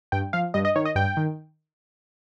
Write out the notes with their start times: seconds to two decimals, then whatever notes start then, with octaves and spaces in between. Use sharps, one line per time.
0.12 G2 G5
0.33 F3 F5
0.54 G2 D#5
0.65 D#5
0.76 D#3 C#5
0.85 D#5
0.95 G2 G5
1.17 D#3